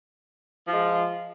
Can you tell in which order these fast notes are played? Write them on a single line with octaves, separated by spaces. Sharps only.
F3 F4 G#3